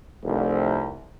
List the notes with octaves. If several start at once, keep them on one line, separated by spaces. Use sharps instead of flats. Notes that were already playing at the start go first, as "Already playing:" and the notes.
F1 C2